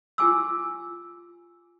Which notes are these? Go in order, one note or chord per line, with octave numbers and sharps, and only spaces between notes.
F4 G4 G#5 D6 E6